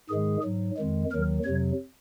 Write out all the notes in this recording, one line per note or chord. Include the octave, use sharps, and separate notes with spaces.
G#2 D#3 G#3 G#4
G#2 F#3
F2 D#3 G#3
D#2 D#3 F#3 A#4
F2 C3 F#3 C#5